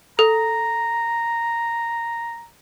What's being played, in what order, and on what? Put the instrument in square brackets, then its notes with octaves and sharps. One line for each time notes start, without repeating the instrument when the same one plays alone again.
[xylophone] A4 [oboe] A#5